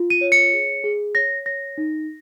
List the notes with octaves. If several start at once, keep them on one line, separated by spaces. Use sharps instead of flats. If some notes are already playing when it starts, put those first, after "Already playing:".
Already playing: F4
D#7
C#5
C#7
G#4
G#4
C#5 A#6
C#5 A#6
D#4